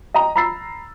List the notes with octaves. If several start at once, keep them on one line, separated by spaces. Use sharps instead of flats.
D#5 G5 A#5
A#5 B5 E6 A6 C7